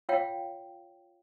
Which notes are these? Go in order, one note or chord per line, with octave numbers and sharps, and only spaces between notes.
F4 C#5 F5 G5